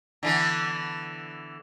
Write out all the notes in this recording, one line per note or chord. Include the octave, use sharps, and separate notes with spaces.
D3 E3 B3